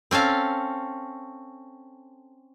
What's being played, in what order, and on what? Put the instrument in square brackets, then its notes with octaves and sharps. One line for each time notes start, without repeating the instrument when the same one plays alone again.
[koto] C4 C#4 A4 F5